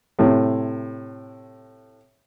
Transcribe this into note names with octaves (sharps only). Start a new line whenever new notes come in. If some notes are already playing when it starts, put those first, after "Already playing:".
A2 C3